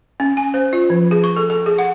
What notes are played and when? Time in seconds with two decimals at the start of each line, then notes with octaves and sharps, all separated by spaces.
0.20 C#4
0.37 G#5
0.54 C5
0.73 F4
0.90 F3
1.11 G#4
1.24 C#6
1.36 A4
1.50 A4
1.66 G#4
1.78 F#5